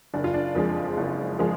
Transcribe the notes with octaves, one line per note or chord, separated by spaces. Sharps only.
F#1 D4
F4
D4
F2 F3 G#3
F#1
F3 G#3